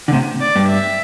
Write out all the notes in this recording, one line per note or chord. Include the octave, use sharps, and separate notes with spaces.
D3
A2 C3
D5
G2
E5